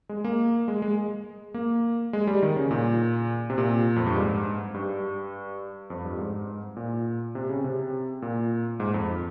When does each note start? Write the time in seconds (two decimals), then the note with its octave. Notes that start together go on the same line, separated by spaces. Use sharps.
0.09 G#3
0.24 A#3
0.68 G#3
0.82 G#3
1.54 A#3
2.13 G#3
2.27 G3
2.42 D#3
2.56 C#3
2.71 A#2
3.50 C3
3.58 A#2
3.96 F2
4.06 G2
4.15 G#2
4.74 G2
5.90 F2
6.05 G2
6.19 G#2
6.77 A#2
7.35 C3
7.49 C#3
7.64 C3
8.22 A#2
8.80 G#2
8.94 F2